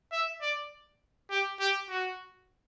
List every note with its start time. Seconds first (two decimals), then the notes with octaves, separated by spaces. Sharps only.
0.12 E5
0.41 D5
1.31 G4
1.60 G4
1.90 F#4